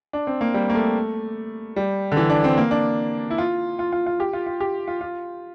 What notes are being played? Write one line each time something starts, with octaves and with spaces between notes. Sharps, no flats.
D4
C4
A#3
G3
A#3
A3
G3
D3
E3
D4
C4
A#3
D4
E4
F4
F4
F4
F4
G4
F4
F4
G4
F4
F4